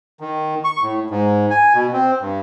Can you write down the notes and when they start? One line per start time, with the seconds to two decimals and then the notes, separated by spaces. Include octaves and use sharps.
0.20 D#3
0.64 C#6
0.82 A2
1.10 G#2
1.50 G#5
1.74 B2
1.93 C4
2.21 G2